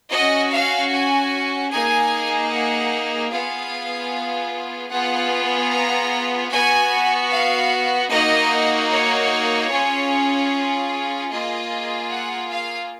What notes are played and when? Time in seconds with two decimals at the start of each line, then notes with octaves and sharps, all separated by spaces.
0.11 C#4 F#4 D#5
0.51 F5
0.91 G#5
1.71 A#3 D#4 G#4 G#5
2.51 F#5
3.31 B3 F4 G#4 F5
4.90 B3 F4 G#4 F#5
5.71 A#5
6.51 B3 F#4 G#5
7.30 F5
8.10 A#3 D#4 F#4 D#5
8.91 C#5
9.70 C#4 F4 G#4
11.30 A#3 F4 G#4 D#5
12.11 F#5
12.50 F5